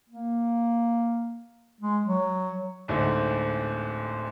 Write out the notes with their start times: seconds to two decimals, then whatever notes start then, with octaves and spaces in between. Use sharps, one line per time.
0.10 A#3
1.81 G#3
2.04 F#3
2.88 D1 D2 G#2 C5 E5